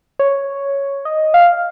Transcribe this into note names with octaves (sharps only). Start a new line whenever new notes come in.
C#5
D#5
F5